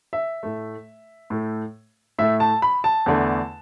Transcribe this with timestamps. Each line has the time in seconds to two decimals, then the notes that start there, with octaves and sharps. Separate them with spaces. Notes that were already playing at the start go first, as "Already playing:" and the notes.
0.13 E5
0.43 A2 A3
1.30 A2 A3
2.19 A2 A3 E5
2.40 A5
2.62 B5
2.84 A5
3.06 E2 D3 A3